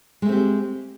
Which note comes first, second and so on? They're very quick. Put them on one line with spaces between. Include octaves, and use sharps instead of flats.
G#3 A3 C4 G4